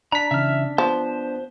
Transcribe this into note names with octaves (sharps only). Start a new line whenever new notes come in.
D4 A#5 B6
C#3 E3 E5 F6
F3 B3 C5